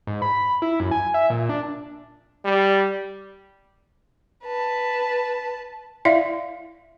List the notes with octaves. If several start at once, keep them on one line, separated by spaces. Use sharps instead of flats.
G#2
B5
E4
F#2
G#5
E5
A#2
D4
G3
B4 A5
E4 D5 E5 F5